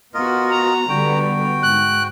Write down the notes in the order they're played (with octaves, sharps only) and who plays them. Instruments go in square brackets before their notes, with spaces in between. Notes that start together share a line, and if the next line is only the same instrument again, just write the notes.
[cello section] B3 F#4 [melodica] F4 A#4 D#5
[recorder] A#5
[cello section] D3 G3 B3 [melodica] F#4 G5
[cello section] G#2 [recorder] F#6